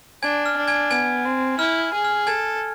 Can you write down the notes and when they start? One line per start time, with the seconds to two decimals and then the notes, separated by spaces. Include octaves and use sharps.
0.22 D4 G#5 G#6
0.46 F6
0.57 D4
0.68 G#5 G#6
0.91 B3 G#5 G#6
1.25 C4
1.58 E4 F6
1.93 G#4
2.05 F6
2.27 A4 G#5 G#6